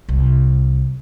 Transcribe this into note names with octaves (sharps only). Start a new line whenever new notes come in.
C2